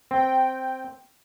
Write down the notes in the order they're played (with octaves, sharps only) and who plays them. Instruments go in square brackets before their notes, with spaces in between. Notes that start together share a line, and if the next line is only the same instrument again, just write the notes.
[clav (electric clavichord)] C4 [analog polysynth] G5